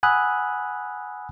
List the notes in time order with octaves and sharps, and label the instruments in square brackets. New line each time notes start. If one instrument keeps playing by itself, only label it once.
[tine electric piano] F#5 G#5 B5 D#6 E6 F#6